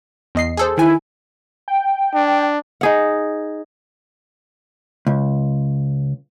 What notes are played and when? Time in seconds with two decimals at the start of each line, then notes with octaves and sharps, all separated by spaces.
0.35 E2 D#5 C7
0.57 G#4 A4 C5
0.78 D#3 E4 G#5
1.68 G5
2.14 D4
2.81 D#4 G#4 F#5
5.07 C#2